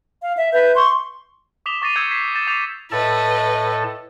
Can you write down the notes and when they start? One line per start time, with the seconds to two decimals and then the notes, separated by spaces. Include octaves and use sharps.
0.23 F5
0.37 E5
0.53 B4 E5 G6
0.75 C6 C#6
1.66 D6 D#6 B6 E7 F7 G7
1.82 C#6 D6 A6 A#6 C7 D#7
1.96 D#6 E6 G6 G#6 C#7 F7
2.11 G#6 B6 C7
2.35 G6 A6 E7
2.47 D6 G6 A6 C7 E7 F7
2.91 A2 A4 B4 D#5 A5